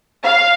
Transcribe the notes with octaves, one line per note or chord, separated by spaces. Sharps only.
F5